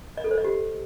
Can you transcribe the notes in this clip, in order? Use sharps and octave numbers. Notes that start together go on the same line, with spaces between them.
D#5
A4
C5
D#5
G4